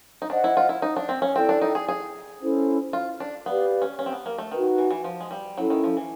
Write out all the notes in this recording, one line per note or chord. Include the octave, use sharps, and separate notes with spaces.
D#4
D4 C5 D#5 F#5
E4
F4
E4
D#4
D4
C4
C#4
C4 E4 A4 D5 G5
D4
D#4
G#4
G#4
C#4 E4 A4 C5
F4
D4
B3 G4 B4 D5 F5
C#4
C#4
C4
B3
A#3
A3
D#3 D#4 F#4 B4
E3
E3
F3
G#3
G3
F#3 C#4 E4 A4
D#3
F3
E3